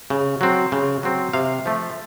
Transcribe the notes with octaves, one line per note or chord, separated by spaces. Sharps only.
C#3
F#3 C4
C#3
F#3 C4
C3 F5
F3 A3